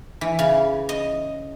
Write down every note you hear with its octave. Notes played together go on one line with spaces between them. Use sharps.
E3
C#3
D#5